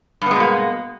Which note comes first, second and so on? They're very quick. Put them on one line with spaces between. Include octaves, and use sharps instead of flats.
G2 B3 G#3 B2 A#3